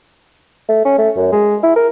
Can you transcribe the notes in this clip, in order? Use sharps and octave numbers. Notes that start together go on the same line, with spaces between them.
A3
C#4
A3
F#2
G#3
E4
A#4